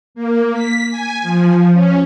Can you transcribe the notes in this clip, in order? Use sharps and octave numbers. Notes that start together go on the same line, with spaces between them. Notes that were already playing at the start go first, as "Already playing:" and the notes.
A#3
B6
G#5
F3
C#4